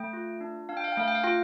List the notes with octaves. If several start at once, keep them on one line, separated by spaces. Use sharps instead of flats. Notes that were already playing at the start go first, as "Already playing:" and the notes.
Already playing: A3 G5
F4
D4
D4 F5
G5
F5
G5
A3 F5
G5
F5
F4 G5